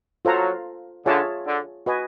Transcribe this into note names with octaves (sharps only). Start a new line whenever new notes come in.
F#3 F4 A4 C5 F5 A#5
D3 F4 G#4 C#5 E5 A5
D3
F#4 B4 D#5 G#5